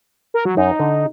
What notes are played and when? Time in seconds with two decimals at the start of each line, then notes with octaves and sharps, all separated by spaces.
0.34 A#4
0.45 F#3
0.57 F#2 D#4
0.80 D3